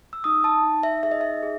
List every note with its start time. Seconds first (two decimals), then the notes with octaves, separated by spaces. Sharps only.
0.13 E6
0.24 D#4 D#6
0.44 A5
0.63 D#4
0.83 E5
1.03 G#4 E5
1.11 D#5
1.21 E5
1.43 G#4